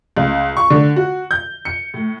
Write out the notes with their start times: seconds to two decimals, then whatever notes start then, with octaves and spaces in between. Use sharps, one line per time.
0.17 C#2
0.57 C#6
0.70 D3
0.96 F#4
1.31 G6
1.65 C#7
1.94 A2